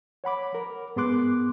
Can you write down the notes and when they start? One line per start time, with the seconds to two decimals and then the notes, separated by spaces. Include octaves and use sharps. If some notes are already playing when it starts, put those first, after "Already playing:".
0.24 C#5 F#5 B5 D6
0.55 A#4
0.96 G#2 B3 G#4 C6 D6 F#6